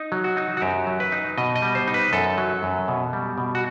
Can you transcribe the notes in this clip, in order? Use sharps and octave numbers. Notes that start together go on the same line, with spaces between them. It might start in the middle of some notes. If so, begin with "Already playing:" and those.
Already playing: D#4
F#3
F#4
D#4
F#4
F#2 G4
F#3
B4
D#4
B2 D#5
D#5
G3
C5
D#4
B4
F#2 A4
F#3
F#2
B2
G3
B2
F#4